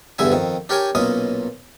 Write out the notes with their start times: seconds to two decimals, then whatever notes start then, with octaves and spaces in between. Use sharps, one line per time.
0.19 E2 G2 D3 E5 G#5
0.32 F2 D#3
0.69 D4 G4 A#4 C#5 G5 G#5
0.95 B1 A#2 C#4 D#5 D#6